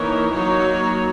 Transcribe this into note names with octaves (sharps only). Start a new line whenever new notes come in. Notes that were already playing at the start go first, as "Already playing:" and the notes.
Already playing: E3 A#3 D#4 A#4 C#5
F#3 A#3 D#4 F#4 C#5